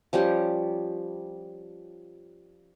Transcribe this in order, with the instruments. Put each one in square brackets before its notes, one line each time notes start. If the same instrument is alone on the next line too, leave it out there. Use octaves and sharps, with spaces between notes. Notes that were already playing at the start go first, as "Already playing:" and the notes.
[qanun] F3 G3 C#4 G4